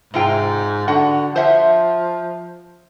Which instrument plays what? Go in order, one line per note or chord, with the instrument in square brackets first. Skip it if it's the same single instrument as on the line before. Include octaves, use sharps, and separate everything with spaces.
[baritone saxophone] G#2 [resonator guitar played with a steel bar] C3 F4 G5
[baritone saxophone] D3 [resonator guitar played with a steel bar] F#4 F#5
[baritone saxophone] F3 [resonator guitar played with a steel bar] C5 E5 F#5